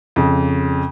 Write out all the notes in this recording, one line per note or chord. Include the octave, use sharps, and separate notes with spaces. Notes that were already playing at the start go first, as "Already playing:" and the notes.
F2 C#3